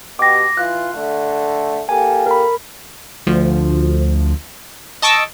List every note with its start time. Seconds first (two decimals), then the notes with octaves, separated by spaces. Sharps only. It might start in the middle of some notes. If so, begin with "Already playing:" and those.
0.19 B2 G4 D6 A#6
0.57 E3 F4 F#6
0.94 D3 A3
1.89 A#3 G4 A4 G#5
2.26 A#4 B5
3.27 D2 F3
5.02 D#5 A5 C#6 D6 E6